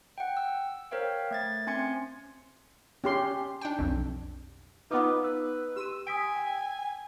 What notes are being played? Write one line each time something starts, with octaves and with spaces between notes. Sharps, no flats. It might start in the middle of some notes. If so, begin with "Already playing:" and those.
F#5 G5
E6
A#4 C5 C#5 F5 G5
A3 G#6 A6
C4 C#4 G#5 C6 G#6 C#7
C#4 G4 C6
D4 G5
B1 F2
B3 D#4 F4 B4 D6 D#6
B4 E6
G4 C6 E6 D#7
G#5 D#6 B6 D7
G5